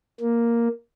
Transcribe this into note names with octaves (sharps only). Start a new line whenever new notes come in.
A#3